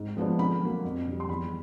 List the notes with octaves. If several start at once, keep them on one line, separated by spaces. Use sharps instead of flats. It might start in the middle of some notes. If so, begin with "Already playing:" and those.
Already playing: G#2
F3 G#3 B3 D4
D3 B5
F#3 A#3
F2
D3 G3
C6
E2 B5